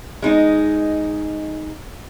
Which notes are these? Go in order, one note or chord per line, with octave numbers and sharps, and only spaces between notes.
G#3 D#4